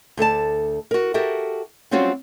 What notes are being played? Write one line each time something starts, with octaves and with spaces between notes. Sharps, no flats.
D2 A4 D5 A5
F#4 A#4
F#4 G4 A4 A#4 E5 G5
F#3 G3 C4 C#4 F4 F#4